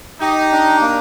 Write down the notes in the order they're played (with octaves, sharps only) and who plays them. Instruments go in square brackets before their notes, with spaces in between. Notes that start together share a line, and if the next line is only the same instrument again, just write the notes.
[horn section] D#4 [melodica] G4
[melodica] D4
A#3